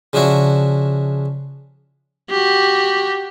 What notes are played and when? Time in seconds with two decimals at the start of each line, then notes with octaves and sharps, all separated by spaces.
0.13 C#3 F3 D4 E4 F#4
2.30 F#4 G4